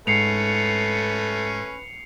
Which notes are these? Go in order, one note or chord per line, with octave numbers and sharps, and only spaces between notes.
G#2 A3 C#4 B4 C7 C#7 F7